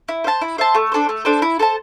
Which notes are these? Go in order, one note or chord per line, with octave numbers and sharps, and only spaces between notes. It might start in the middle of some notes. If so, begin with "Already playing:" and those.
E4
C5 E5 A5
E4
C5 E5 A5
A3
D4 A4 C5
A3
D4 A4 C5
E4
A4 C5 A5